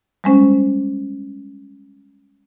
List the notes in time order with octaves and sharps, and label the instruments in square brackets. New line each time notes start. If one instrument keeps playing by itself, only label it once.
[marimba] G3 G#3 C#4 C5